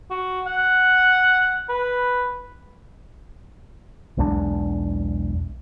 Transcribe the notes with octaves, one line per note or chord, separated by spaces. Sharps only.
F#4
F#5
B4
B1 E2 G#3 D4